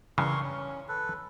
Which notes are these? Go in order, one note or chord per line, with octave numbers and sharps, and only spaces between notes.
G2 C#3 E3 A#4 C6 C#6
C#4
A4 B4